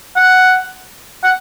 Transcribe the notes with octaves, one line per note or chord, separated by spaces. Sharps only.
F#5
F#5